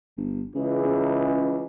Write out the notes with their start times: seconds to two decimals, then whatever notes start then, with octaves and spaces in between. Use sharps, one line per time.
0.17 G1
0.55 C#2 C#3 E3 G#3
0.84 C#3